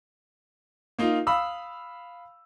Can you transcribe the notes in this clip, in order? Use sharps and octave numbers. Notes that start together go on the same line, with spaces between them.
A#3 D#4 F4
F5 B5 D#6 E6